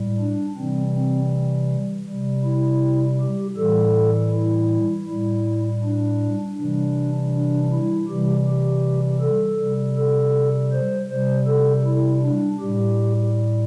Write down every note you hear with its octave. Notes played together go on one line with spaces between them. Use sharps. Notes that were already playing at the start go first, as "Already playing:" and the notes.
Already playing: A2 G3
D4
C3 E3 G3 C4
C4
C3 G3
E4
G4
A2 E3 G3 A4
E4
A2 G3 E4
D4
C3 E3 G3 D4
D4
E4
C3 E3 G3 G4
G4
A4
C3 G3
A4
C5
C3 G3 C5
A4
E4
D4
A2 G3 G4